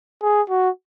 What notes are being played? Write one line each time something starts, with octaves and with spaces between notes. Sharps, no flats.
G#4
F#4